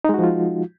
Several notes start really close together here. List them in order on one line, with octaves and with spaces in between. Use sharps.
D#4 G#3 F#4 F3 F4